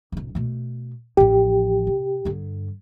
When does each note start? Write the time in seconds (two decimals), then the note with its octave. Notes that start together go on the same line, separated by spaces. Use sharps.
0.12 D1 C3
0.35 B2 A3
1.17 A1 F3 G4
1.87 C3
2.25 G2 D3